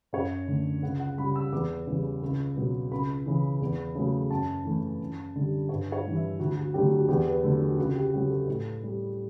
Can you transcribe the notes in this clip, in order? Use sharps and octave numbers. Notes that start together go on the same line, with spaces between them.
F#2 C#5
D3 A3
C#2 F#5
F#5
C#3 G3 B5
E6
E2 D6
C#3 E3 G3
C#2
B2 F#3
C#2 B5
C#3 E3
E2
C#3 F#3 A3
F#2 A5
E3 A3
F#2
D3 G3
G2 C#5
C#5
E3 G3
E5
D2 F#4
F#4
D3 F#3 A3 G4
F#4
E2 G4
B4
D3 F#3 A3 A4
F#4
C#2 F#4
G4
C#3 F#3 G4
A4
A2
G3